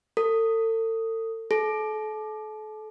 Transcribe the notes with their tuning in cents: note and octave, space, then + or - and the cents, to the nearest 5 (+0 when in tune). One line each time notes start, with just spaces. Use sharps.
A4 +40
A4 -35